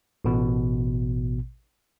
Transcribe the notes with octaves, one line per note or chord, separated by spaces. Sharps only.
A1 B2